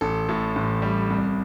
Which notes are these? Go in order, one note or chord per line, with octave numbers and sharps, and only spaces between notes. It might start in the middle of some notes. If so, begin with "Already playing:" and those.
A1 A4
A2
A1
G3
C2